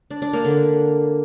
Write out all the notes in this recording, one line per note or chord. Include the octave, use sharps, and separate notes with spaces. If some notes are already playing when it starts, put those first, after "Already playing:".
D4
D4
A#3
D3